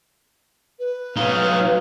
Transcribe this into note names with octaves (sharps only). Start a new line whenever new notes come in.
B4
F#3 D#4 F5